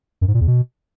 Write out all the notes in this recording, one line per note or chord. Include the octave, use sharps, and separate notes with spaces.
F#2
G#2
A#2
E2
B2